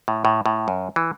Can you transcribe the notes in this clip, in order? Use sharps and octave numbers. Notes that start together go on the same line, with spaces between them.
A2
A2
A2
F#2
E3